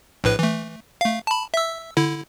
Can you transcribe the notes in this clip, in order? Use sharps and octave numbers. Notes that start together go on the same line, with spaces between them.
A#1 A2 B4
E3 A3
A3 F5
A5 B5
E5 E6
D3 E4